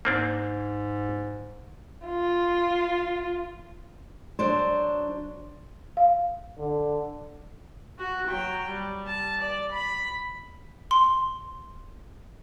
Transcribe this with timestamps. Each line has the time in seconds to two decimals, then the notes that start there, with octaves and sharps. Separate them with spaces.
0.05 G#2 A#3 C4 D4
2.06 F4
4.39 F#3 D4 C5
5.97 F5
6.59 D3
7.98 F#4
8.28 F#3 G5
8.69 G3
9.07 A5
9.41 D5
9.72 B5
10.91 C6